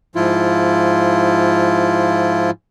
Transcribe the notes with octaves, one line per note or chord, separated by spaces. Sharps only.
G#2 F3 E4 F4